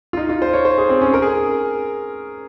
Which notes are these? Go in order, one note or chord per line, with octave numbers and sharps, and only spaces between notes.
F4
D#4
F4
C5
C#5
C5
G#4
C4
C#4
A#4
G#4